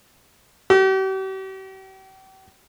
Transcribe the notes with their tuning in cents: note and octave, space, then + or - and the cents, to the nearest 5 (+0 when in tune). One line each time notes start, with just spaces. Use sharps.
G4 -45